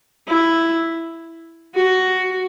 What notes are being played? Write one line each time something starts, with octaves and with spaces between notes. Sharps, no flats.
E4
F#4